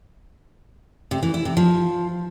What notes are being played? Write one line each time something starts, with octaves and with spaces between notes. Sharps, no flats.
C3
E3
E4
C3
F3